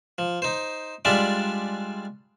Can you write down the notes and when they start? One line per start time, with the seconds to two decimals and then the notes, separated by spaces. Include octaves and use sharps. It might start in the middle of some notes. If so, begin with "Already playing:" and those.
0.18 F3
0.42 D#4 C5
1.05 G3 G#3 D4 F4 D5 E5